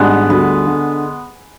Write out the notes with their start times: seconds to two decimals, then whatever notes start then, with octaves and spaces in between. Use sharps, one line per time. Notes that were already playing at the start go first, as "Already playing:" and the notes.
Already playing: G#1 G#2 G3 G#3 B3 D4
0.29 D2 D3 G3 B3
0.67 D3